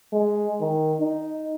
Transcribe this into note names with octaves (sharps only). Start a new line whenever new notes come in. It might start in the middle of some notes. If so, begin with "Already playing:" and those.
G#3
D#3
D#4